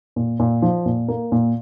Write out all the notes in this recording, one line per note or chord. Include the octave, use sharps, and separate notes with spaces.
A#2
A#2
F3
A#2
A#3
A#2